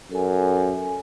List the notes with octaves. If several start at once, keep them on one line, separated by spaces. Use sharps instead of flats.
F#2 A4 G#5